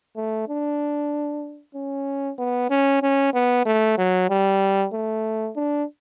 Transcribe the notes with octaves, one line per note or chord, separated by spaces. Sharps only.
A3
D4
C#4
B3
C#4
C#4
B3
A3
F#3
G3
A3
D4